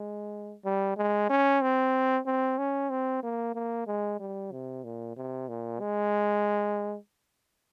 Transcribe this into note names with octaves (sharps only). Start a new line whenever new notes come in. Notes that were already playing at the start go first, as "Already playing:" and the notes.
Already playing: G#3
G3
G#3
C#4
C4
C4
C#4
C4
A#3
A#3
G#3
G3
C3
A#2
C3
A#2
G#3